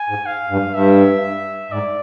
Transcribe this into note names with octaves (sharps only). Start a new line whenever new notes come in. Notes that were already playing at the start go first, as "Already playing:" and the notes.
Already playing: G#5
G#2
F5
G2
G2 E5
G#2 D5